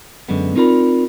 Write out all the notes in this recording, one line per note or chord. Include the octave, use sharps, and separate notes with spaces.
F#2 D3 G#3 B3
C4 D#4 F4 A#4 D5 B5